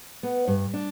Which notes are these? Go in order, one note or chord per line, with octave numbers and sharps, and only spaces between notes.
B3
G2
D4